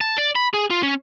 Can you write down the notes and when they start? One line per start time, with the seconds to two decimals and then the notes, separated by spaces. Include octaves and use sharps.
0.01 A5
0.18 D5
0.35 B5
0.53 G#4
0.70 F4
0.83 C#4